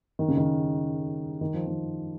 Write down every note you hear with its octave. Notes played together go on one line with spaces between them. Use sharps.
D#3
C#3
D#3
D#3
F3
D#3